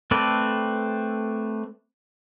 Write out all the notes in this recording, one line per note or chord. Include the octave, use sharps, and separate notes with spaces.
A3 C4 A4 B4 D5